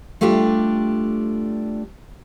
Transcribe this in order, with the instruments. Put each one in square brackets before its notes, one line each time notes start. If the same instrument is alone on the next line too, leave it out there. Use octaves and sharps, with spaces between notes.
[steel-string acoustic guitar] G3 A3 D4 F4 G4